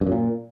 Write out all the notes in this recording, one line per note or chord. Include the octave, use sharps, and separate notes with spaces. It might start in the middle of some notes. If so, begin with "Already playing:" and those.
G2
F#2
A#2